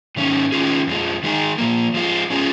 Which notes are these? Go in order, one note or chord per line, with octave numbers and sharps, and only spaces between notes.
G#2 D#3 C#4
D#3 C#4 F4 G#4
F2 F3 G#3
D#3 G#3 D#4 G#4
A#2 F3 A#3
F3 G#3 F4
F3 C#4 F4 G#4